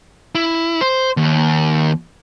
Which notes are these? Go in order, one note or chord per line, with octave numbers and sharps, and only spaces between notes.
E4
C5
D#2